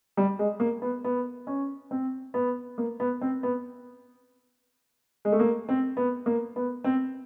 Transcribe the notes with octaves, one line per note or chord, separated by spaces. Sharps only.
G3
G#3
A#3
B3
B3
C#4
C4
B3
A#3
B3
C4
B3
G#3
A3
A#3
C4
B3
A#3
B3
C4